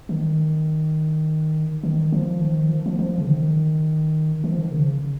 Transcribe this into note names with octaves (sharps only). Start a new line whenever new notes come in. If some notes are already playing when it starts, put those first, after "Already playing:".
D#3
D#3
F3
D#3
F3
F3
F3
C#3
D#3
D#3
F3
D#3
C#3